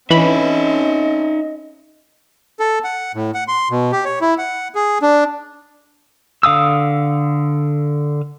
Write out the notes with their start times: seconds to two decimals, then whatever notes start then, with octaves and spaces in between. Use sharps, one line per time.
0.10 E3 C4 C#4 D#4 A4 D#5 E5 B5
2.59 A4
2.84 F#5
3.15 A2
3.34 F#5
3.48 C6
3.71 B2
3.92 G4
4.05 C#5
4.21 E4
4.38 F#5
4.75 G#4
5.02 D4
6.43 D3 F5 D#6 E6